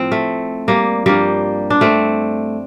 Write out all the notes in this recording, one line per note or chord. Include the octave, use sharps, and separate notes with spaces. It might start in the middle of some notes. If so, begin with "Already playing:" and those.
Already playing: A2 F3 C4
A3
G3 A#3
G2 F3 G3 A#3
D4
A3 C4